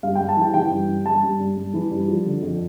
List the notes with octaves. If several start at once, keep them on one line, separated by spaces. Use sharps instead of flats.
G2 F5
G5
G2
A5
E3 G5
E3 G5
G2
G2
G2 A5
G2
G2
G2
E3
G2
F3
D3
F2